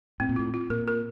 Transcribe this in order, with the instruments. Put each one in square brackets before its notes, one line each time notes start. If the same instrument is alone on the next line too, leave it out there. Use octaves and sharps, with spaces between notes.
[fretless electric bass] A2 [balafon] C4
[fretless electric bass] A#2
[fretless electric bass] A2 [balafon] F4
[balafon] F4
[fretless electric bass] A#2 [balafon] A#4
[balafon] A#4